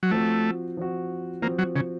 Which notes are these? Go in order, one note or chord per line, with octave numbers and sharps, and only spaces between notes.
F#3
F3 A3 C4 F#4
F3 C4 F#4
F3 A#3 C4 F#4
F#3
C#3